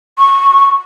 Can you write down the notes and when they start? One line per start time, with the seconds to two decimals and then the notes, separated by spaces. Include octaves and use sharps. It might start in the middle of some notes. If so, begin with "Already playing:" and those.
0.19 C#6